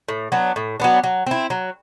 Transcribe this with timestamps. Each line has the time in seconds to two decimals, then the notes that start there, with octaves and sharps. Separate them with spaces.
0.08 A2
0.32 F#3 B3 D4
0.56 A2
0.80 F#3 B3 D4
1.04 F#3
1.27 C4 E4
1.50 F#3